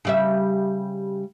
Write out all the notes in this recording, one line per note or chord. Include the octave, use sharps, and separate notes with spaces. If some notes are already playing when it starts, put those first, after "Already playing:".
C#3 G3 E5